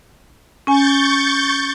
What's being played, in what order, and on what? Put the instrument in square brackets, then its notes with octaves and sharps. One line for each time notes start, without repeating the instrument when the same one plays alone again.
[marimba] C#4 G#5 [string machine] C#6 G6 A6